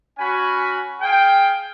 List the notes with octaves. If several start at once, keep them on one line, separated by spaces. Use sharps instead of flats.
C#4 F#4 G#5 B5
G#4 F5 G5